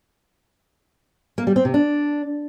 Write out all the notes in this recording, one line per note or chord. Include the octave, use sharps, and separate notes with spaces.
A#3
G3
C4
C3
D4